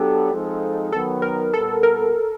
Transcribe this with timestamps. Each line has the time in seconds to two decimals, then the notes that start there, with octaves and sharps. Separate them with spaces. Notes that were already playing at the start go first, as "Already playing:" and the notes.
Already playing: F#3 B3 D4 G4 A4
0.31 F3 G#3 C4 D#4
0.92 D#3 F#3 B3 A4
1.22 A#4
1.53 A#2 G3 B3 A4
1.83 A#4